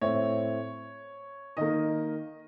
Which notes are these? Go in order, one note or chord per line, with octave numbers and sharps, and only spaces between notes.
A2 A3 C4 C#5
D#3 A#3 D#5